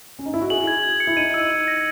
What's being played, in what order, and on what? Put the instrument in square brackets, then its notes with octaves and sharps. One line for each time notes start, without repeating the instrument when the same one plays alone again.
[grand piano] C#4
D#4
E4
F#4
[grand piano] G#4 [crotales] F#7
[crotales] G#6
G#6
C#7
[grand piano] E4
[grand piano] D#4 [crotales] D#7
[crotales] E6
F#7
A#6